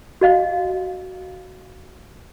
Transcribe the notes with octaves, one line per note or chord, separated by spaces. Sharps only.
F#4 D#5 F5